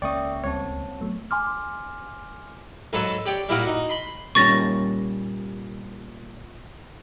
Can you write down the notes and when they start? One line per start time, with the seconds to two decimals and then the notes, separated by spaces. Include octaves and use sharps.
0.02 C#2 A#3 C#4 D5 E5 G5 C#6 D#6
0.44 D2 G3 C4 C#5 A5
1.00 F#3 A3 B3
1.31 G#5 C6 D6 F6
2.93 G#2 F#3 A4 B4 C#5 A5
3.26 G4 C#5 D5 G5
3.49 A#2 G3 E4 F#4 A#4 D6
3.63 D#4 F#4
3.89 B5 C6
4.35 A#2 G3 C#4 C#6 A6 A#6